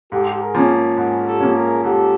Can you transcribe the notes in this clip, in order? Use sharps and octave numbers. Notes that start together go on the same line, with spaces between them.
G#2 G4 A4
G#4 A#4
F3 A#3 C#4
G#2 G#4 A#4
G4 A4
F3 A#3 C#4
G#4 A#4
G#2 G4 A4